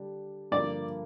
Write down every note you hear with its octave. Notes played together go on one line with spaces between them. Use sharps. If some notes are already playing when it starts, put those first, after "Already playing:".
Already playing: D3 G3 D4 G4
G2 D3 F3 A#3 D5